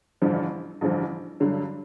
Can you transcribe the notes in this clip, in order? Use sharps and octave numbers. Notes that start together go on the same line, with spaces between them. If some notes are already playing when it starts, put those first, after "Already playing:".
A1 G2 D3 F3
A1 G2 D3 F3
G2 D3 F#3